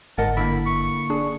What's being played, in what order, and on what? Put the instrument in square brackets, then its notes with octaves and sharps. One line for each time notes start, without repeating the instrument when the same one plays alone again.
[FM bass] G1 [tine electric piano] G#2 [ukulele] A#4 D#5 F#5 [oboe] A5
[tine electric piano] D3 A#3 [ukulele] E4 [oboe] B5
[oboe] C#6
[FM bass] D4 [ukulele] G#4